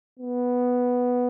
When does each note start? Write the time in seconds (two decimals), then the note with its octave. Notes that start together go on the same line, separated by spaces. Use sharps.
0.19 B3